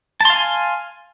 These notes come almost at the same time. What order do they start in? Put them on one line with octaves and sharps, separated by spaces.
A5 C6 F5 G#5